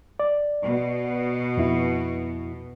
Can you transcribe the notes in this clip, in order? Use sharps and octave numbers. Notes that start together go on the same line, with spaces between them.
D5
B2
F2 E4